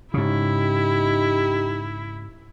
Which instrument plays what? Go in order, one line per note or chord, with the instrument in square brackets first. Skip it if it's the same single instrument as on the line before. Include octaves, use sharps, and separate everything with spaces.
[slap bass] G#2 C#3 [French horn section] D#4 G4 [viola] E4